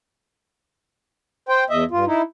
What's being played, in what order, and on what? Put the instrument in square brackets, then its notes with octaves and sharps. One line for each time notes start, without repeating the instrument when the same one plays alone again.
[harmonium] C5 G5
E2 D#5 E5
G2 F4
D#4 E4